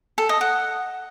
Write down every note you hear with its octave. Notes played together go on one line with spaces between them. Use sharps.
A4
D#5
F#5